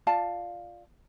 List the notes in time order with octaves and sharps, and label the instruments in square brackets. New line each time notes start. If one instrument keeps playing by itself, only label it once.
[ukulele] F4 D5 F5 A5